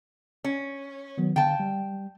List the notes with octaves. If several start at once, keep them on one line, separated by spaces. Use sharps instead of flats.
C#4
D#3 F#3 B3
D3 F5 G5 A5
G3